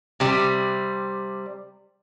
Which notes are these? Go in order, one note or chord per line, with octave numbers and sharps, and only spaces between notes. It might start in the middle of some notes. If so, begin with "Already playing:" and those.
C3 G3